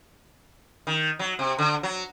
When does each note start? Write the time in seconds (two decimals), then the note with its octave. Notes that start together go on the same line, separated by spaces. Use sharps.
0.87 D#3
1.19 F#3
1.39 C3
1.58 D3
1.83 F#3